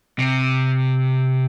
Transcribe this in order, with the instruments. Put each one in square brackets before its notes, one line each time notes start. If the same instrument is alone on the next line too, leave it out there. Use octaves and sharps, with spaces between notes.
[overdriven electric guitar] C3